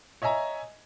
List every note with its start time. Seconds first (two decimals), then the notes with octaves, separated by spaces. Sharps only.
0.22 C#5 D#5 E5 G#5 A#5